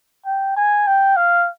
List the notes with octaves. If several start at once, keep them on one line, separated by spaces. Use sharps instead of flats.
G5
G#5
G5
F5